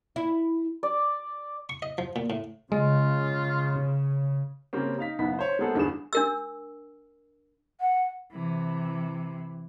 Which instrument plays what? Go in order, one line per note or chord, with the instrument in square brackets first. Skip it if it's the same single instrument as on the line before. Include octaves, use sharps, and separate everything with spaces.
[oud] E4
[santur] D5
[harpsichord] C#6
D#5
F3
A#2
A2
[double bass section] C#3 [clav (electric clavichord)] G#3 [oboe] F4
[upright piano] C#3 G3 A#3 C4 C#4
D#4 F5 B6
F#1 B1 B3 B6
C5 C#5
G#3 A#3 B3 G#4 A4 C5
E2 G2 D3 G#4 E7
[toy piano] D4 A#4 E6
[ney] F#5
[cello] C3 E3